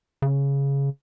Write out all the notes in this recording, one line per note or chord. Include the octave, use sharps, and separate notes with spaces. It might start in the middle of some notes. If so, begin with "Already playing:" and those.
C#3